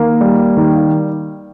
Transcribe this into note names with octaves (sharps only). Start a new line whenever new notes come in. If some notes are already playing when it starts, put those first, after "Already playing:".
Already playing: D#3 A#3
G3
D#3